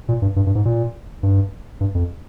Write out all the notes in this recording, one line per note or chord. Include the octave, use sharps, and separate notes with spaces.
A#2
G2
G2
G2
G#2
A#2
G2
G2
F2